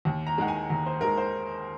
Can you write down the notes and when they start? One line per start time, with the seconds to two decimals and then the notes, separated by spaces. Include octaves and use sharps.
0.05 D#2
0.27 A#5
0.38 D#3 G#3 F#5
0.48 G#5
0.70 D#2 A#5
0.86 C5
1.01 D#3 G#3 A#4
1.17 C5